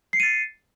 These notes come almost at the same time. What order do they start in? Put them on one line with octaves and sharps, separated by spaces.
C7 C#7 D#7 A6